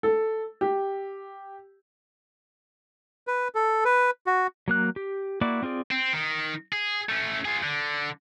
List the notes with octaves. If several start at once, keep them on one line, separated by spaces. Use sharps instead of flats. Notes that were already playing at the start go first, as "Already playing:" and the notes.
A4
G4
B4
A4
B4
F#4
F#3 A#3 F#6
G4
A#3 E4 F#4 D5 D6
C4 F4 G#4 D5
C4
D#3
G#4
A3 C#4
F4 G#4
D3